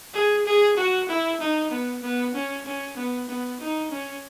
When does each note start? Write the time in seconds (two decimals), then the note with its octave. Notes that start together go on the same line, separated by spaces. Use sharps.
0.14 G#4
0.46 G#4
0.77 F#4
1.09 E4
1.40 D#4
1.71 B3
2.03 B3
2.34 C#4
2.65 C#4
2.96 B3
3.28 B3
3.60 D#4
3.91 C#4